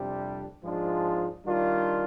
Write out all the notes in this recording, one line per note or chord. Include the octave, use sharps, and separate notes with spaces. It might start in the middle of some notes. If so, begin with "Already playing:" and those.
Already playing: F2 C3 G3 D4 G4
G#2 F3 G#3 D4 F4
D#3 G3 D4 F4